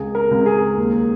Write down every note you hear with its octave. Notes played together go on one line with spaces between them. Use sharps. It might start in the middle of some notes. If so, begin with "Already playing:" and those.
Already playing: C#2 G#4
A#4
C#2
G#4
D#2